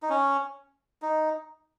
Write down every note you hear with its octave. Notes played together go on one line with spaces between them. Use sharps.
D#4
C#4
D#4